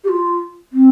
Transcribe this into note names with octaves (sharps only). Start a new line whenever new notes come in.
G4
F4
C4